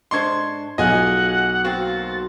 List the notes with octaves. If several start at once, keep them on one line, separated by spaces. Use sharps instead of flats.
G#2 D4 C5 C6 C#6 G#6
B1 F4 G#4 D#5 F#5 G#5
A#3 C4 F#4 A6